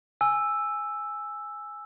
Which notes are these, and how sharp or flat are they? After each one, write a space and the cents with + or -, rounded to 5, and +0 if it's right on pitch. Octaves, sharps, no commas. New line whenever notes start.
G#5 +0 E6 +0